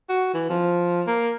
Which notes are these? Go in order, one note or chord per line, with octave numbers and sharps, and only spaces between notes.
F#4
E3
F3
A#3